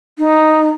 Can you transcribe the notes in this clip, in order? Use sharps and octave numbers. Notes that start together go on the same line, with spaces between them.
D#4